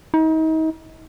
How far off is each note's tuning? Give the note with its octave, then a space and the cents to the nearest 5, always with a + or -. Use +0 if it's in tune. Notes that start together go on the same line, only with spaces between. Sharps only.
D#4 +35